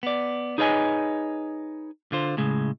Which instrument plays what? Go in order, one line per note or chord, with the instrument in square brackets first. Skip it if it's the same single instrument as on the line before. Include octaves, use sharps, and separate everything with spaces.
[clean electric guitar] B3 D5
D#4 G#4 B4 C#5 D#5 G#5
D3 F4 C5
A2 C#3 G#3